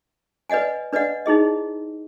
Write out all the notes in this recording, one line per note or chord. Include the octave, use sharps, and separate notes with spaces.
B4 D5 D#5 F#5 G#5
D4 B4 D5 D#5 F#5
D#4 E4 G#4 D#5